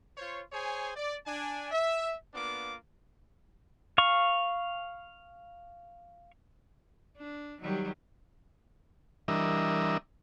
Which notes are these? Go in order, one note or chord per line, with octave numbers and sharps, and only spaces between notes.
F4 C5 C#5
G#4 C5 C#5 G#5
D5
D4 G#5
E5
A#3 B3 D4 F4 D6
F5 C#6
D4
D#3 F#3 G3
E3 G3 D4 A#4 D#5 E5